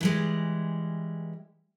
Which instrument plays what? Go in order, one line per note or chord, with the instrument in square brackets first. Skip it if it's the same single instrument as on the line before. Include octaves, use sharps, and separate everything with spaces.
[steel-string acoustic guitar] E3 G3 G#3